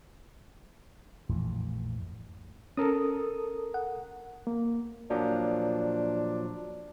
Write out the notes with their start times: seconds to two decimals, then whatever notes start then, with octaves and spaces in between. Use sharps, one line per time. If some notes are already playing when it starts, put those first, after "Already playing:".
1.30 A#1 F2 A2 E3
2.77 C#4 A4 A#4 D#6
3.74 F#5
4.47 A#3
5.10 A#2 F3 F#3 D4